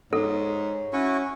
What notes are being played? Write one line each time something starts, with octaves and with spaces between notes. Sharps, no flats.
G#2 A4 C#5
C#4 E4 F#4 C#6